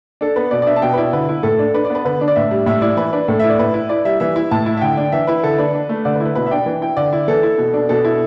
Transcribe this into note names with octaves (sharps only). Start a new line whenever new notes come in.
D4 A4
B3 B4
B2 D5
D5
D4 E5
A5
B2 G5
B4
E4 D5
D3 B4
E4
A2 A4
D4
D4 B4
D5
B3 B4
D3 B4
D4
D5
A2 E5
G3
A2 E5
E4 D5
E3 B4
D4 B4
A2 A4
E4 E5
D5
A2 B4
E4
E4 D5
G3 E5
E3 E5
E4
A2 A5
E4
E5
D3 G5
D4
E3 E5
E4 B4
D3 A4
D4 B4
D4
A3
D3 D5
B4
E4
B4
B2 B4
E5
D4 G5
E3
E4 G5
D3 D5
E4
E3 A4
E4
B2
D4
B2 A4
E4